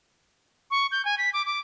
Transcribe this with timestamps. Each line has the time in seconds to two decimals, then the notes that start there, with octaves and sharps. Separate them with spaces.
0.71 C#6
0.92 G6
1.05 G#5
1.18 B6
1.33 D6
1.46 D6